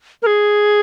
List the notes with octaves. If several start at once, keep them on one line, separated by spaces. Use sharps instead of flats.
A#4
G#4